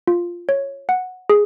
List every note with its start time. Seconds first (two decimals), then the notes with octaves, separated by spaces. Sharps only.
0.07 F4
0.49 C#5
0.89 F#5
1.30 G#4